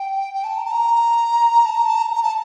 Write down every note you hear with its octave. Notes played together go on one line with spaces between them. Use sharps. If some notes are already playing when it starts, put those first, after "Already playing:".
Already playing: G5
G5
A5
A#5
A5
A#5
A5
A#5
A5
A#5
A#5
A5